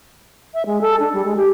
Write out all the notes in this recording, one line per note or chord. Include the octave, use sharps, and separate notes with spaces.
E5
G#3
A4
D4
G3
G#3
G4